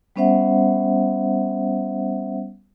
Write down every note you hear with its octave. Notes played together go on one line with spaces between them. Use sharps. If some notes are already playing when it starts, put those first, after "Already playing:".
G3 B3 C#4 C5 E5 F#5